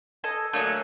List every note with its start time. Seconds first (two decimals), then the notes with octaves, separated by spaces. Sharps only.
0.24 A4 D#5 G#5
0.53 D3 F#3 A3 A#3 G#5